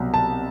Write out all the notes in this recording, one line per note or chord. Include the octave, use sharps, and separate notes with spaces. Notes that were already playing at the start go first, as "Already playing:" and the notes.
Already playing: C2 B2 F#3
A5